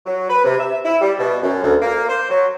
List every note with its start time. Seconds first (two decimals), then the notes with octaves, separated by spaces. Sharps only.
0.06 F#3
0.29 B4
0.44 C3
0.59 E5
0.85 E4
1.01 G3
1.19 B2
1.42 F#2
1.63 D2
1.82 A#3
2.09 C5
2.30 F#3